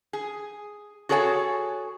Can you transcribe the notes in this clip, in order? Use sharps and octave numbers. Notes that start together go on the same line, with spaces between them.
G#4
F#4 G#4 A4 C#5 G5 G#5